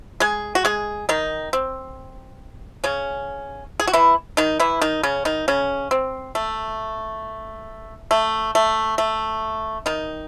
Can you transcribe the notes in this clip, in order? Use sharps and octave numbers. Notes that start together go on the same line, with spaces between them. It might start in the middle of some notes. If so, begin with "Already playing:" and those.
G#3 G#4
F#4
G#3 G#4
D#3 D#4
C4
C#3 C#4
G#4
F#4
E3 E4
D#3 D#4
E3 E4
D#3 D#4
C#3 C#4
D#3 D#4
C#3 C#4
C4
A3
A3
A3
A3
D#3 D#4